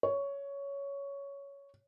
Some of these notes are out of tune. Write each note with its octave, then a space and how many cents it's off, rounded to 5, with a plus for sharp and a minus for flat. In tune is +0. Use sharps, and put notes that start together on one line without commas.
C#5 +10